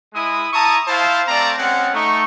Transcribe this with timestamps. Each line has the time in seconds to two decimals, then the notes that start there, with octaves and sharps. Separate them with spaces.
0.14 G#3 E4 D#6
0.53 E4 A5 A#5 C#6 D#6
0.86 E4 C5 F5 A5
1.28 A3 C4 D5 F5 A5 A#5
1.58 G#3 C4 C#4 F#5
1.93 A3 D#4 C#6